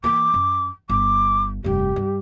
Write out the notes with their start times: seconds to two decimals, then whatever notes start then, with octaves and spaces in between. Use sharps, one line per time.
0.04 E3 A#3 D6
0.34 F#2
0.89 G1 D6
1.64 F1 G2 G4
1.96 G2